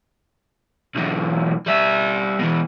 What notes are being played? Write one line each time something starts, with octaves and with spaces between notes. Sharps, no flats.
B1 E3
G3 E5
B2 E3